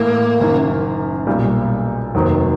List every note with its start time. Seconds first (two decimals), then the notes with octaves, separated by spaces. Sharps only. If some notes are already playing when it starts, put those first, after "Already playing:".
Already playing: A2 E3 A3 A#3
0.40 F#1 F#2 D#3
1.27 B1 A#2 G3
2.15 F1 D#2 D#3 F#3